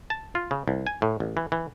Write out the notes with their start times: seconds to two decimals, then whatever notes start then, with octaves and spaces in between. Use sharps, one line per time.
0.10 A5
0.35 F4
0.51 C#3
0.68 C2
0.87 G#5
1.02 A2
1.20 A1
1.37 E3
1.52 E3